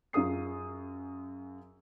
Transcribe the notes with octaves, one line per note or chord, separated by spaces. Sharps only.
F#2 F4 G#4 D#6 C7